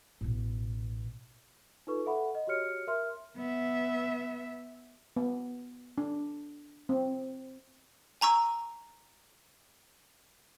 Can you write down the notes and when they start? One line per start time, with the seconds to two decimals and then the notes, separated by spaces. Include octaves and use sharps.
0.21 A1 B2
1.87 D#4 F4 A4 B4 C#6
2.06 A4 E5 F#5 B5
2.35 D#5
2.47 F#4 G4 C#5 F6 C#7
2.87 A#4 E5 C6 F6
3.37 B3 E5
5.16 B3
5.98 D4
6.89 C4
8.21 G#5 A#5 C#6 E6